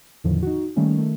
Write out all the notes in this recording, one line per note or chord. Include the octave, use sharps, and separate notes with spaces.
E2 A2 D3 D#3 F3
D#4 F#4
D#3 G3 A3 A#3 C#4
D#3 A3